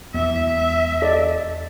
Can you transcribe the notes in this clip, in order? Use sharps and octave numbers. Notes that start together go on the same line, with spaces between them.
E2 B3 E5
A4 D5 D#5